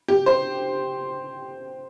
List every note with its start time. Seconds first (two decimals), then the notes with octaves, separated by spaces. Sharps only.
0.08 G4
0.26 C5